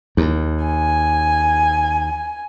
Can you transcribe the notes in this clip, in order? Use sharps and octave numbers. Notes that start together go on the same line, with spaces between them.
D#2
G#5